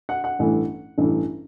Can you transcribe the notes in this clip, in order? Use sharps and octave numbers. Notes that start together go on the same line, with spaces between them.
F#5
F#5
A1 G2 E3 A3
A1 G2 E3 A3